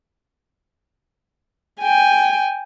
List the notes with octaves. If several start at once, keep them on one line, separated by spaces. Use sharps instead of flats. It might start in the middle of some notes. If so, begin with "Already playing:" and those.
G5 G#5